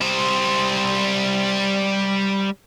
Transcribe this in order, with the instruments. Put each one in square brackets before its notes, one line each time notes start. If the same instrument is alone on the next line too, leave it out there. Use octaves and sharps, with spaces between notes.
[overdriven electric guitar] G3 C5